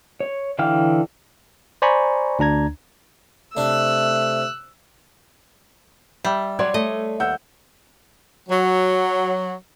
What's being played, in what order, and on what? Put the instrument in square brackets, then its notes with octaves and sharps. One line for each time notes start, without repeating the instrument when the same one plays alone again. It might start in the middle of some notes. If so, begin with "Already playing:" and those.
[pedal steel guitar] C#5
D3 E3 F5 G5 F6
[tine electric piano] C5 D5 G#5 A#5 B5 C#6
D2 D4 A#5 G#6
[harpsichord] C3 D4 [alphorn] A3 [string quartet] E6 F#6
[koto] G3 [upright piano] E5
[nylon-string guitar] F#3 [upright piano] C#5 C6 G#6 [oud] D5
[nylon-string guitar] A3 [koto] D#5
[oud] D#2 [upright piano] F#5 E6 G6
[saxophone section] F#3